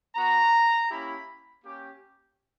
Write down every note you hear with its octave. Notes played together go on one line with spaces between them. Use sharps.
B3 F#4 A#5
A#3 C#4 E4 G4 B5
A#3 C#4 G4